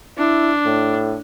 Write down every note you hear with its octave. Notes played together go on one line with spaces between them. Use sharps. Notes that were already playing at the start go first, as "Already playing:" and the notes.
D4 E4
A2